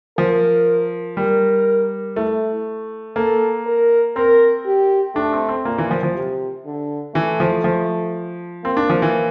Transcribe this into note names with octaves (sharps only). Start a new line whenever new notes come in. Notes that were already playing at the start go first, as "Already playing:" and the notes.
F3 A#4
G3 A#4
A3 E4
A#3 A4
A#4
C4 A#4
G4
A3 D4
C4
C4
A#2 A#3
E3
F3
F3
C3
D3
E3 A3
F3
F3
A#3 C4
D4
F3
E3